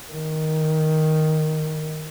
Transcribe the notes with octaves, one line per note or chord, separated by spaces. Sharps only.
D#3